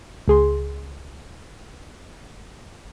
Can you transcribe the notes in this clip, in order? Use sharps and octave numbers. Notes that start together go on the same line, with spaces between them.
C#2 G#4 C6